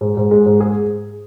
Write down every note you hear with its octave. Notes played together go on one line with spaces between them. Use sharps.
G#2
G#2
G#3
G#2
G#4